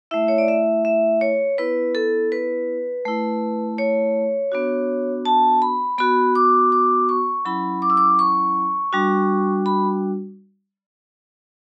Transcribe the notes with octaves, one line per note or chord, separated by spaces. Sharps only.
A3 E4 E5
C#5
D5
E5
E5
C#5
B3 E4 B4
A4
B4
A3 E4
C#5
B3 D4 F#4
A5
B5
B3 F#4 B5
D6
D6
C#6
F#3 C#4 E4 B5
D6
E6
D6
C#6
G3 D4 F#4
B5